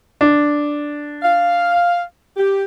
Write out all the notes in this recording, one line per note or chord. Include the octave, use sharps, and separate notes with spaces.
D4
F5
G4